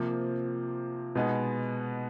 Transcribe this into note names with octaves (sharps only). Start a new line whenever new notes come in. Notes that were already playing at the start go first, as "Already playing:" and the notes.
Already playing: C3 F3 A#3
B2 G#3 B3 D#4